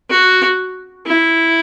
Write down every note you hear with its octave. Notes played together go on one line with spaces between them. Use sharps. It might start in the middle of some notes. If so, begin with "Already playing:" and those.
F#4
E4